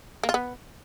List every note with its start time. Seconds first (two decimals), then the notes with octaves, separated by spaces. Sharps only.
0.23 A#3
0.29 F4
0.34 B3